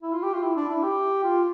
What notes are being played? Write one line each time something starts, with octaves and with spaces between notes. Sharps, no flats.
E4
F4
G4
F4
E4
D4
E4
G4
F4